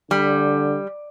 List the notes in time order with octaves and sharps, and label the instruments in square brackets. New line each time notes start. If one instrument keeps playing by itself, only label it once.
[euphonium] D3 [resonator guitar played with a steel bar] G3